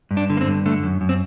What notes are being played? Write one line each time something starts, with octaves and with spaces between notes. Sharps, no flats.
G2
D4
D3
A#3
C4
G2
D3 A3
F#2
F#2
C4